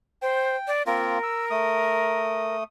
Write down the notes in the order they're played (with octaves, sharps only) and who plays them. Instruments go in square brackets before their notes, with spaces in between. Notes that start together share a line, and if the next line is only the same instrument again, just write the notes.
[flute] C5 [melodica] G5
[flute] D5
[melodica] A#3 C4 F4 [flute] A#4
[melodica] E6
A3 D#6